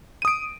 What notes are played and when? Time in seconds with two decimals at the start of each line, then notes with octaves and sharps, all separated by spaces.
0.22 D#7
0.25 D#6
0.28 D7